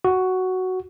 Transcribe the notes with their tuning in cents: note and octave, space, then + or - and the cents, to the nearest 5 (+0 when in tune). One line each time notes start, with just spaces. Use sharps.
F#4 +5